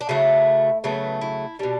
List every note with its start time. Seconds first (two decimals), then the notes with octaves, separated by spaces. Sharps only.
0.01 D4
0.09 C#3 F#3 A3 E4
0.84 C#3 F#3 A3 B3
1.21 E4
1.59 B2 G3 D4